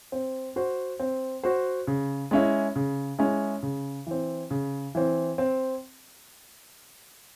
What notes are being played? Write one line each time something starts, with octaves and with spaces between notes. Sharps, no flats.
C4
F#4 C5
C4
F#4 C5
C#3
G#3 C#4 E4
C#3
G#3 C#4 E4
C#3
E3 C4
C#3
E3 C4
C4